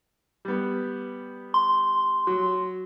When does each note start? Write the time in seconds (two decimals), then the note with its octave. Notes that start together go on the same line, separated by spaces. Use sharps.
0.45 G3 B3
1.54 C6
2.27 F#3